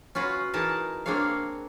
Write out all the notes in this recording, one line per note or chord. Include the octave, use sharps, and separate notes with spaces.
C#4 F4 F#4 B4
E3 D#4 G#4 A#4 A5
A#3 C4 D4 G#4 C#5 F5